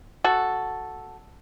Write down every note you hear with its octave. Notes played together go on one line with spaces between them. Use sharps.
F#4 A4